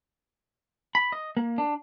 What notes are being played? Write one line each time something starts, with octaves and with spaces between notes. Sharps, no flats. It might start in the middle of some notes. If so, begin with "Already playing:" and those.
B5
D#5
A#3
D4